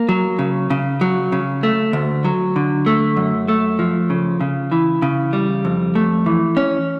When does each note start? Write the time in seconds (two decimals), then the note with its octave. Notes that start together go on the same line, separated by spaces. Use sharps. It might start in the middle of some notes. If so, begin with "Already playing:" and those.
Already playing: A#3
0.09 F#3
0.39 C#3
0.70 C#3
1.01 F#3
1.32 C#3
1.63 A3
1.93 D2
2.25 F#3
2.56 D3
2.86 A3
3.17 F#2
3.48 A3
3.79 F3
4.10 C#3
4.41 C#3
4.72 E3
5.02 C#3
5.33 G3
5.65 F2
5.95 A3
6.26 E3
6.57 C#4